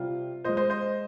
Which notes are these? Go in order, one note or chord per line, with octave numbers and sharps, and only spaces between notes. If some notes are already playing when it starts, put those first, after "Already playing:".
Already playing: C3 G3 F4
A#2 G#3 C5 D#5
C5 D#5
C5 D#5